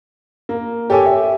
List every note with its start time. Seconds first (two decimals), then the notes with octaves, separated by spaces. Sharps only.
0.49 A#3
0.90 G4 A4 C#5 G#5 D6
1.06 E5